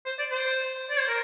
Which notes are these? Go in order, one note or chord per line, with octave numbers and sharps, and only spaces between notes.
C5
D5
C5
D5
C5
A#4